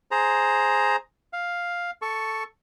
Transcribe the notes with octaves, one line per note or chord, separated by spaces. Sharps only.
G#4 C5 A#5
F5
A4 C#6